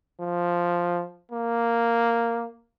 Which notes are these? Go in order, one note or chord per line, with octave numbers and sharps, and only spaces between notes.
F3
A#3